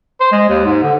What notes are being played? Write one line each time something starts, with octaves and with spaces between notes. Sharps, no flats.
C5
G#3
D#2
G#2
D3